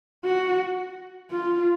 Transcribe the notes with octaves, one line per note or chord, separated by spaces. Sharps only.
F#4
F4